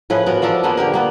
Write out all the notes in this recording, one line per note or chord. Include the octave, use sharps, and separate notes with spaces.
A2 F3 G#4 B4
B3 F#4 A#4
F3 D4 A4 A#4
F3 A#3 B3 G#4
D3 G4 A#4
A#3 B3